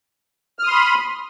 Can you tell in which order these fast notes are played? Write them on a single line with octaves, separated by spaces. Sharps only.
F6 D#6 C6 B5